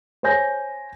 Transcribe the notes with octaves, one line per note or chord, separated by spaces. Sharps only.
C5 C#5 G#5 G6 A#6